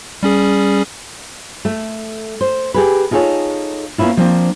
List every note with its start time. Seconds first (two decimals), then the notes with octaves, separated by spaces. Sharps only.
0.23 G3 C#4 G#4
1.65 A3
2.41 C5
2.74 G4 G#4 B4
3.11 D#4 F4 G#4 A4 C#5
3.98 A#3 B3 C#4 E4 F4
4.17 F3 A#3 C4 D4